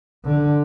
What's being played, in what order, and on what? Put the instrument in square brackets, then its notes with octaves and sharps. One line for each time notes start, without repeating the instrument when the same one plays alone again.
[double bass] D3